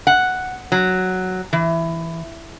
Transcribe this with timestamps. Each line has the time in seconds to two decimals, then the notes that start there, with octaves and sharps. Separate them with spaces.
0.07 F#5
0.72 F#3
1.53 E3